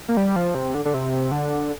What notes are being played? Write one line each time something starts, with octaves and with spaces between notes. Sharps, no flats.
A#3
G3
F3
C3
D3
D3
C3
D3